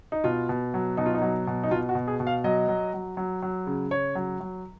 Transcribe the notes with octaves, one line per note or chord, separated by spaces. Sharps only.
D#4
B2 F4
B2
F#3
B2 D#4
F4
D#4
F#3
B2
D#4
B2 F4
F#4
B2
G#4
B2
F5
F#3 D#5
F#3
F#3
F#3
F#3
C#3
C#3 C#5
F#3
F#3